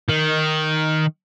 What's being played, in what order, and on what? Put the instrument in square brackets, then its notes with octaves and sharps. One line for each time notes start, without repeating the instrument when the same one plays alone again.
[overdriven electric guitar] D#3